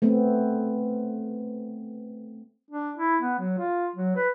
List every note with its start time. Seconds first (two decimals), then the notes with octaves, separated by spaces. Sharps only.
0.02 A3 B3 C4
2.71 D4
2.97 E4
3.21 B3
3.39 F#3
3.58 F4
3.96 F#3
4.16 B4